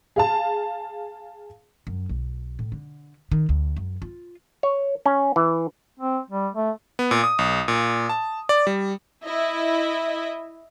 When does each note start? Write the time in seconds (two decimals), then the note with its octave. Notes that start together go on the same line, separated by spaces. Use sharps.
0.16 G#4 F5 A5
1.87 F#2
2.09 B1
2.59 A2
2.72 D3
3.31 D#3
3.49 D2
3.77 F#2
4.02 F4
4.63 C#5
5.06 C#4
5.36 E3
5.99 C4
6.30 G3
6.53 A3
6.99 B3
7.11 A#2
7.24 D#6
7.39 B1
7.68 A#2
8.09 A5
8.49 D5
8.67 G3
9.24 E4 D#5 E5